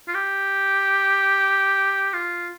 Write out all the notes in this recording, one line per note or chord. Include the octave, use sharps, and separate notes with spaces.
F4
G4
F4